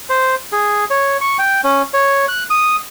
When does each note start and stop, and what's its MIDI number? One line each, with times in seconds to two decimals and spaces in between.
0.10 0.35 72
0.52 0.85 68
0.90 1.17 73
1.21 1.37 85
1.39 1.61 79
1.64 1.82 61
1.94 2.26 73
2.28 2.44 90
2.50 2.76 87